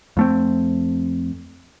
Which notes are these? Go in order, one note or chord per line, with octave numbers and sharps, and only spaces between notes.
F2 A3 C4